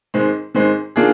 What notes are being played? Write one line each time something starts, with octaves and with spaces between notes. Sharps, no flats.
G#2 D#3 G#3 C4
G#2 D#3 G#3 C4
D#3 A#3 D4 F4 G#4